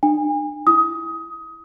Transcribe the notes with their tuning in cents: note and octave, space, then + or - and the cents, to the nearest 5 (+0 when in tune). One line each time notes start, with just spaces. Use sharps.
D4 +45 G#5 -35
E4 +0 D#6 +20